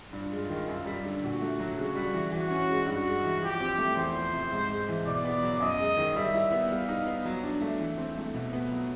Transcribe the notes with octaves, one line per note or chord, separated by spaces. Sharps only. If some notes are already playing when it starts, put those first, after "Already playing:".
G2 F4
G#3
D#3
F#2
G3
D3
A#2 F#4
A3
F#3
C#3 F#4
G3
E3
E3 F#4
C#4
G#3
G2 F#4
G#3
E3
F3 G4
C4
A3
E2 C5
F3
C3
G#2
G#3
E3
B2 D5
B3
F#3
F#2 D#5
G#3
D#3
G3 E5
E4
B3
G3 F5
D#4
B3
F#3
D4
A3
E3
C4
A3
B2
B3
F#3